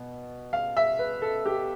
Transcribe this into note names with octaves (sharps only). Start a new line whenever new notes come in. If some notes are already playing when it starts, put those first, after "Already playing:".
Already playing: B2
F5
E5
B4
A4
G4